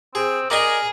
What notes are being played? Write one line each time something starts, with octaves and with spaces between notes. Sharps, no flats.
C4 G#4
G#4 A#4 D5 D#5 G#5